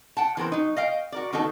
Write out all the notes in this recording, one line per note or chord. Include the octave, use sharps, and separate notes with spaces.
F#5 G5 A5
E3 B3 A#4 C5
F#3 D#4
D#5 F5 G5
F#4 A#4 D5
D#3 B3 D#4 F#4 A4